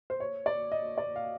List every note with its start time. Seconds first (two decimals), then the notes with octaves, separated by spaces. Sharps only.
0.10 C5
0.20 C#5
0.46 D5
0.72 D#5
0.98 D5
1.16 F5